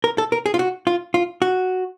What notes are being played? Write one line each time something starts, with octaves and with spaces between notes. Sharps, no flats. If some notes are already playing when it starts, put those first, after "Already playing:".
A#4
A4
A#4
G#4
F4
F#4
F4
F4
F#4